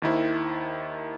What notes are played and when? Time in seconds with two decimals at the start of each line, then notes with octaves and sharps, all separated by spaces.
0.02 D#2 D#3 E4 C5